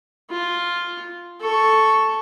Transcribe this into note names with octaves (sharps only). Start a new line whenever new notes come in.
F4
A4 C#6